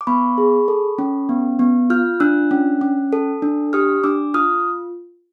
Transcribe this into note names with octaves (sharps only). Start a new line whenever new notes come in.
D6
B3 B5 C#6
G#4
A4
C#4
B3
B3
F4 F6 G6
D4 E6 F#6
C#4
C#4
A4
D4
G4 D#6 F6
D4 D6 E6
F4 D#6 F6